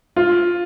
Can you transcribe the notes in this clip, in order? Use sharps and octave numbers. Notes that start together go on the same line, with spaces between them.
F4